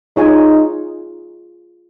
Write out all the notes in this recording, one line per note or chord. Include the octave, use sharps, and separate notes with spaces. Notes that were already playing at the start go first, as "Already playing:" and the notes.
D#4 F4 G#4 C#5 G#5